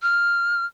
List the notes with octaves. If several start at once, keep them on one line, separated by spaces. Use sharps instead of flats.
F6